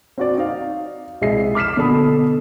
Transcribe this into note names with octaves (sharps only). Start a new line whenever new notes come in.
C4 F#4 D5
D#4 F5
C2 G#3 G#4 D#5 E5 C7
D6 F6 B6 C7 E7
B2 D3 A4 B5 D#6